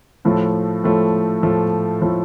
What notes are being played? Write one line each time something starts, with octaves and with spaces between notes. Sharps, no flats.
A2 F3 A3
A2 F3 A3
A2 F3 A3
A2 F3 A3